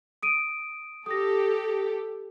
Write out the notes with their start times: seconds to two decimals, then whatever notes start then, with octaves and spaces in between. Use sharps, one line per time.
0.23 D#6 D7 D#7
1.06 G4 A4 D#6 A#6